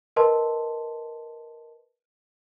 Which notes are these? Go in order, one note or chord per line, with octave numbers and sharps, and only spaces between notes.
A#4 B4 D#5 A5 C6